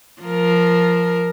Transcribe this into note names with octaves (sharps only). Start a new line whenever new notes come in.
F3 A#4